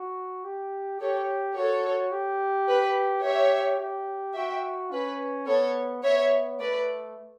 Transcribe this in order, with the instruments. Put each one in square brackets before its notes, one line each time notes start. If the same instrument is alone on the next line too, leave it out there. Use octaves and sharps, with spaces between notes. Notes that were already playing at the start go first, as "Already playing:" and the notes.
Already playing: [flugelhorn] F#4
G4
[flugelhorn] G4 [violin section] A4 C#5
[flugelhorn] F#4 [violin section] A4 C#5
[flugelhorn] G4
[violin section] B4
[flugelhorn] G4 [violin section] C#5 E5
[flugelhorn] G4
[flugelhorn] F#4 [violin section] E5 G5
[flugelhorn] C#4 [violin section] B4
[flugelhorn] B3 [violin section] A4 C#5
[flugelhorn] B3 [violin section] C#5 E5
[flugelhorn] A3 [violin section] B4 D5